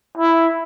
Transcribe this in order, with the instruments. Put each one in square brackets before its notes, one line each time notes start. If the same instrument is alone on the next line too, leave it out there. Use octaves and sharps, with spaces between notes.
[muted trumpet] E4